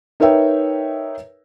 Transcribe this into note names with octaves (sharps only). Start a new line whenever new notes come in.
D#4 A#4 B4 C#5 E5 G5